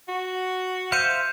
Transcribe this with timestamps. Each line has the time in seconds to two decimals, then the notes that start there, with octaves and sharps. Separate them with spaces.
0.08 F#4
0.92 C5 E5 F5 G6 C#7 D#7